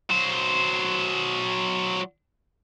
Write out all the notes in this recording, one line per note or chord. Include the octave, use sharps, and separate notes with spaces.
F#3 C5